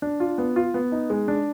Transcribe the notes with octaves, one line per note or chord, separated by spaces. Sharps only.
D4
F4
B3
F4
B3
D#4
G#3
D4